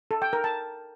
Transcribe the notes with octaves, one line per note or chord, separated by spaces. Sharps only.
A4
G5
A#4
A5